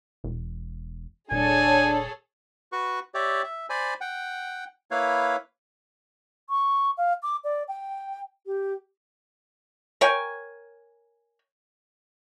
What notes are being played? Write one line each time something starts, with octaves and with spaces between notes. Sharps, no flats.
E1
D#1 D4 G#4 A4 C#5 G#5
F#4 B4 C#6
G4 C#5 D5 E5
E5
C5 D5 G#5 B5
F#5 G5
A#3 E4 B4 C#5 F5
C#6
F5
D6
D5
G5
G4
A#4 C#5 G5 G#5